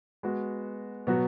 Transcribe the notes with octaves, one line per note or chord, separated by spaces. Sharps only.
G#3 B3 F#4
B2 F#3 B3 F#4